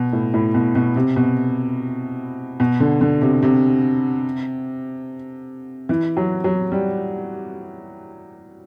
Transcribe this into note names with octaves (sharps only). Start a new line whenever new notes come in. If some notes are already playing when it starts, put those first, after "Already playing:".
Already playing: B2
A2
A2
B2
B2
C3
B2
B2
D3
D3
C3
C3
E3
F#3
F#3
G3